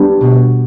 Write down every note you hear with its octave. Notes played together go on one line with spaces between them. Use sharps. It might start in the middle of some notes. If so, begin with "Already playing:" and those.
Already playing: G3 B3 D4
B2